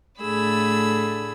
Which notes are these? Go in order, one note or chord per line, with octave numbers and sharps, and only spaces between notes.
A2 D3 A3 G#4 B5 E6